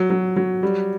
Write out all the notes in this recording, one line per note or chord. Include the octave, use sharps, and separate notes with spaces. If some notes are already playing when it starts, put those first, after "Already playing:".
Already playing: F#3
F#3
F#3
G3